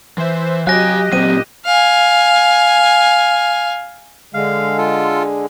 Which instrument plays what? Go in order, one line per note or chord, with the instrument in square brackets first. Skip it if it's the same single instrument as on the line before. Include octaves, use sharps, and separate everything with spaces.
[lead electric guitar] E3 [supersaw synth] C5 E5
[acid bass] F#3 [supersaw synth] G4 D#5 [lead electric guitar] F5 G#5 [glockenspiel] F#6 A#6
[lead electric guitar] A#2 F#3 [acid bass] C4 [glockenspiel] D#7
[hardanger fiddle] F5 G#5
[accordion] D3 G#3 [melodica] F5
[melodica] F4 A4